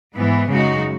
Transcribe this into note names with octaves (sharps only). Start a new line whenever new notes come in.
G#2 E3 B3
F#2 C#3 G#3 D#4 F#4